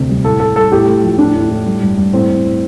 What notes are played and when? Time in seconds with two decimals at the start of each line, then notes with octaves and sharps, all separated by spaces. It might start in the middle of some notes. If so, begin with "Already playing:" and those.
Already playing: D2 C3
0.09 G3
0.24 A2 A4
0.40 A2 A4
0.56 G3 A4
0.72 A2 G4
0.88 A3
1.03 F3
1.18 A2 D4
1.34 A2
1.50 A2
1.66 G3
1.82 G2
1.98 G2
2.13 A2 C4
2.29 A2
2.45 A2